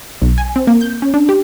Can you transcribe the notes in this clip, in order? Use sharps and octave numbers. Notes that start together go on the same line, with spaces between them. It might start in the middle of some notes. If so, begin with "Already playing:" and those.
B1
G#5
C4
A#3
G6
C#4
D4
G4